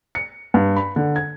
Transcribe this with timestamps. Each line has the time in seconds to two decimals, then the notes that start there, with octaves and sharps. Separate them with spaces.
0.15 C#7
0.54 G2
0.77 B5
0.96 D3
1.16 G#6